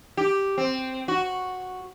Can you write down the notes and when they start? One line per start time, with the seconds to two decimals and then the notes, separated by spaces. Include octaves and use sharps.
0.17 G4
0.58 C4
1.08 F#4